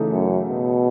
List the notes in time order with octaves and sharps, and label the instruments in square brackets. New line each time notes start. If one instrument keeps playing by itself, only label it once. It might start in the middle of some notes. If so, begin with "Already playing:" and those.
Already playing: [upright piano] C#3 E3 A3 D#4 A4
[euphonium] F#2
B2